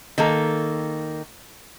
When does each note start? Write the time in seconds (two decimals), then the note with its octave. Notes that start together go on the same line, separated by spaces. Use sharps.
0.18 D#3 A#3 A4